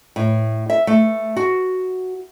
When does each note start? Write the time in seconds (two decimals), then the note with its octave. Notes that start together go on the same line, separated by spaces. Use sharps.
0.16 A2
0.70 E5
0.87 A3
1.36 F#4